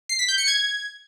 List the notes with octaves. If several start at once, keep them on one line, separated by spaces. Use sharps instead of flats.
C7
B6
G6
C#7
G#6